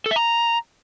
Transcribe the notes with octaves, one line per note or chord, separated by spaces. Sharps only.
A4
E5
A#5